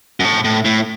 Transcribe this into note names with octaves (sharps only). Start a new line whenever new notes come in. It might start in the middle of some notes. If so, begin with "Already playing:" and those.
F#2
A2
A2
A2